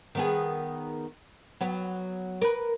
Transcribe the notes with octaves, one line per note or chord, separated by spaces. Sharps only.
D#3 B3 G#4
F#3 B3
A#4 B4